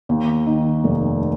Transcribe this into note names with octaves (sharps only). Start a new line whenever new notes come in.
D#2
D#3
F1